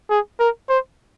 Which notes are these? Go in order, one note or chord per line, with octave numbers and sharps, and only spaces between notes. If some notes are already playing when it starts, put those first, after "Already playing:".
G#4
A#4
C5